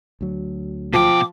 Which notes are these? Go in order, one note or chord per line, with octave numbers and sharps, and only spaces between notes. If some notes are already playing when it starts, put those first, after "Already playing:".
D2 F#3
B2 F3 G5 D6